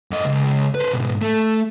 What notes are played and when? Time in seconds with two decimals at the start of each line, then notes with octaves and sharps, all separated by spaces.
0.11 F#2 D#5
0.25 C#2
0.75 B4 C5
0.93 G#2 B2
1.22 A3